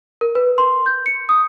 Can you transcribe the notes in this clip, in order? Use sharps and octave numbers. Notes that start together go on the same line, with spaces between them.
A#4
B4
C6
G6
C#7
D#6